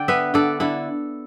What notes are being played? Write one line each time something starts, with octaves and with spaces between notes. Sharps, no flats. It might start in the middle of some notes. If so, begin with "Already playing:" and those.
Already playing: D3 D5 G5
B3 B4 E5
D3 A4 D5
D3 E4 A4